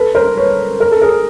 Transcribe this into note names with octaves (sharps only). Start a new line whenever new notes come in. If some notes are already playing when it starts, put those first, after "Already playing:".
Already playing: A4 B4
A#4 C5
B4 C#5
A#4
A4
G#4 A#4